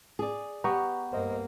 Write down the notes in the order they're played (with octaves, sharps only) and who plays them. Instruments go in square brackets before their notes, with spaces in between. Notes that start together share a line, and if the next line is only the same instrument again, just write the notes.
[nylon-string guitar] G#4 D5
[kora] B3 G4 [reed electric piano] A#5 C#6
[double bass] G2 A#3 [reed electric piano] C5 D#5